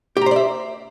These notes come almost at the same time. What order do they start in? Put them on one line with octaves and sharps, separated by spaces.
G4 A#5 C5 D5 E5